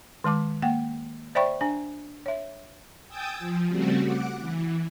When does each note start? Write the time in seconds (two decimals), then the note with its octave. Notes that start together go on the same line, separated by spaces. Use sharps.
0.24 D#3 G#3 A5 D6
0.62 A#3 F#5 G5
1.35 C5 D5 E5 G5 B5 C#6
1.61 D4 G#5
2.26 C#5 E5
3.08 G5 G#5 D#6 E6 G6 A6
3.39 F3
3.68 C#3 G3 A3 C4 F#4
4.02 F#5 D6
4.39 E3